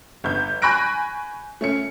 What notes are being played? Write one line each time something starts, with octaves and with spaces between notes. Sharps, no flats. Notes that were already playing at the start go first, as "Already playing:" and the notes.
G1 G6
G#5 B5 C#6 F#6 A#6 D7
A3 C#4 C#7